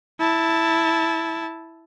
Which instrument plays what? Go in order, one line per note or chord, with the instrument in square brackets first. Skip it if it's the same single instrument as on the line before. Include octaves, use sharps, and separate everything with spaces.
[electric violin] E4 A5